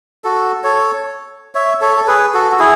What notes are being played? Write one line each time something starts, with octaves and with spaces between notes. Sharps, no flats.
F#4 A4
A4 C#5
C#5 E5
A4 C#5
A4
G#4 B4
F#4 A4
F#4
E4 G#4